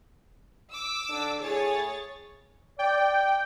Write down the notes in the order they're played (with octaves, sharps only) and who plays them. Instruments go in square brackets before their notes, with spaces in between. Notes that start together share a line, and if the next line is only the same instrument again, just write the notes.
[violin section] D6 E6
[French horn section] D3 D4
[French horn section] A2 G#4 [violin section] C#5 A6
[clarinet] D5 [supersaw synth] G5